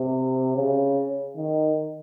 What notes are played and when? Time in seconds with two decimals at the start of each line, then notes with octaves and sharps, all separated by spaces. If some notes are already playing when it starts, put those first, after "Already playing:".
Already playing: C3
0.56 C#3
1.37 D#3